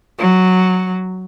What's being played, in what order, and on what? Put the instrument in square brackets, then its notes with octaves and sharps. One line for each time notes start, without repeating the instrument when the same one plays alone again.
[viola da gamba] F#3